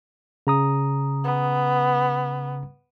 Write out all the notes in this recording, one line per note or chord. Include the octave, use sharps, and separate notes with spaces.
C#3 A#5 D#6
B3